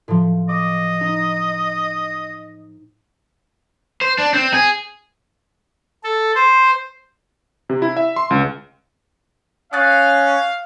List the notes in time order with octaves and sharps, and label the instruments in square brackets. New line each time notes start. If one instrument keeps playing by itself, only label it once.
[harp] A2 F3
[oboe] D#5 [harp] D6
[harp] D#4
[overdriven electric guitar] C5
D4
C4
G#4
[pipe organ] A4
C5
[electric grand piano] C3
E4
E5
C6
C#2
[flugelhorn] C#4 [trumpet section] F5 [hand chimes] D#6 F#6 A6